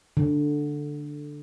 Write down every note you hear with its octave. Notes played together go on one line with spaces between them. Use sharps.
D3